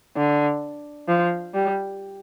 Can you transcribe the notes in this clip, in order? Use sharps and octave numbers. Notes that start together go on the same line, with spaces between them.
D3
F3
G3